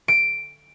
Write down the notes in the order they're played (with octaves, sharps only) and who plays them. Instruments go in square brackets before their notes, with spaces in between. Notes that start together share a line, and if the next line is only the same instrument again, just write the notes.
[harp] D7